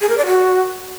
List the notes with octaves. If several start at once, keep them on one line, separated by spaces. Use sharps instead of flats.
G#4
A#4
D5
F#4